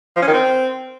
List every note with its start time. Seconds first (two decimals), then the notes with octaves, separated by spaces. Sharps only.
0.16 F3
0.22 C#4
0.28 D#3
0.34 C4